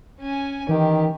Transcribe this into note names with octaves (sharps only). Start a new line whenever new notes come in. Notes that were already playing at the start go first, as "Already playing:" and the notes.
C#4 G#5
D#3 E3 G4